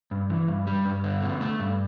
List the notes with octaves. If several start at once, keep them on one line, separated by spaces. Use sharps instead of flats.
G2
E3
G2
G3
G2
D3
B2
A3
G2